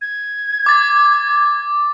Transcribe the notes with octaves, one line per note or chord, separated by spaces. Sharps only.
G#6
D6 A6